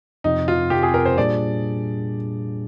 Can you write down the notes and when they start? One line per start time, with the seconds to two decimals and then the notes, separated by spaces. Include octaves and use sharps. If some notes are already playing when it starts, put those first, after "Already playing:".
0.24 F2 C3 F3 C4 D#4
0.48 F4
0.70 F2 C3 F3 C4 G4
0.83 G#4
0.94 A#4
1.05 C5
1.18 A#2 G3 D4 G#4 D5